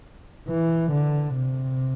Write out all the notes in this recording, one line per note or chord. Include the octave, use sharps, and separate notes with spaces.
E3
D3
C3